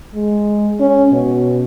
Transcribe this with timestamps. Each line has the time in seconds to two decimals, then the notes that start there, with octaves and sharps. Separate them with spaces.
0.15 G#3
0.80 C#4
1.12 B2